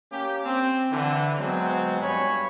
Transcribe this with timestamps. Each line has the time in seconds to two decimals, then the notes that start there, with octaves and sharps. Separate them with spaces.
0.11 A#3 C#4 G4
0.45 C4
0.92 D3 E3
1.38 F#3 G#3 B3 C4
2.01 G2 C#5 G#5 B5